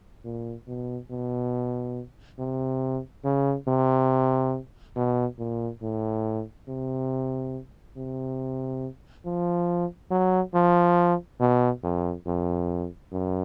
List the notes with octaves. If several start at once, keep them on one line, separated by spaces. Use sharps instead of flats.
A#2
B2
B2
C3
C#3
C3
B2
A#2
A2
C3
C3
F3
F#3
F3
B2
F2
F2
F#2